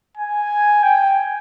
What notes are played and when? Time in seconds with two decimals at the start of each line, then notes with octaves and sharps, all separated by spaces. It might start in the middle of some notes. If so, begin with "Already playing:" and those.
0.18 G#5
0.83 G5